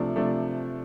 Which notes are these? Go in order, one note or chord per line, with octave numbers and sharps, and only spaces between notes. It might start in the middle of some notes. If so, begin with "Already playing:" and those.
Already playing: C3 F3 A3 D4
C3 F3 A3 D4